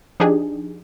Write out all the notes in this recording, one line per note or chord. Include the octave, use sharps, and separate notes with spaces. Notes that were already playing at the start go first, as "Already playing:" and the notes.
F3 D4 D#4 G4 G#4